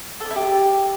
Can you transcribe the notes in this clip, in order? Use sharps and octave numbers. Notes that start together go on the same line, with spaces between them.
A4
D4
E4
G4